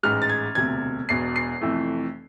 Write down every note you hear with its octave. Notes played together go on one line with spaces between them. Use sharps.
A1 G#2 G#3 F6
A6
G#6
E1 D2 C3 G#6
E1 E2 B2 C7
C7
F1 F2 E3 A3